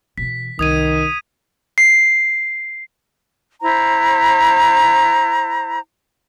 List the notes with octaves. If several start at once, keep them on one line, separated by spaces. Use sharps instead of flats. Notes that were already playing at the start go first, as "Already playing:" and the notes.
B2 E3 B6
C2 D#3 D#6 G#6 D#7
C7
E4 C5 A#5